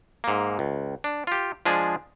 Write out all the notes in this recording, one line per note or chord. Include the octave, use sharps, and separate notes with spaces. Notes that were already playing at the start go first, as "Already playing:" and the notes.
G#2 A#3
C#2
D4
F4 G4
F3 G#3 D4 G#4